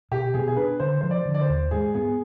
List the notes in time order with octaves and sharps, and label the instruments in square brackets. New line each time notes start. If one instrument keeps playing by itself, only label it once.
[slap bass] B2 [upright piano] G4
[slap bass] B2 [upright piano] G#4
[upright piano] G#4
[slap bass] D4 [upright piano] B4
[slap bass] D3 [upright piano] C5
[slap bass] F3 [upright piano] C5
[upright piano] D5
[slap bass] D3
[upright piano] D5
C5
[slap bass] D#2
[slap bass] G#2 [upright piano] G#4
[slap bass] B3 [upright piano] G#4